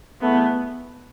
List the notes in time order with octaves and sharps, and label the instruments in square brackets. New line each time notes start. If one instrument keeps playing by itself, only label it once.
[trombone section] E2 E3 A3 [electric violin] B3